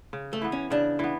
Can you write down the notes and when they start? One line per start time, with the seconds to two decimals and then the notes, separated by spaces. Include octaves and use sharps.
0.13 C#3
0.33 A3
0.42 E3 B3
0.52 C#4
0.71 C#3 D4
0.99 E3 B3